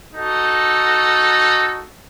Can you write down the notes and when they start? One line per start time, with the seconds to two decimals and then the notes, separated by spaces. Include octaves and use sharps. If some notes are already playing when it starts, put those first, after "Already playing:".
0.14 D#4 F#4 A4